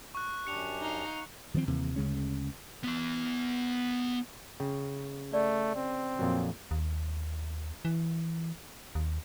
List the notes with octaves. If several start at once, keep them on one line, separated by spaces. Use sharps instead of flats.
C#6 F#6
F#2 D4 G4 C#7 F7
D#4 F5
D#3 F3 A#3 C4
D#2 C3 E3 A#3
D2 C#3 G#3 C#4
B3 E5
C#3 G5
A3 D5
C4
F2 A#2 F#3
D#2
E3
D#2